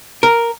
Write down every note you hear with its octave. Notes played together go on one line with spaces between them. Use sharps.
A#4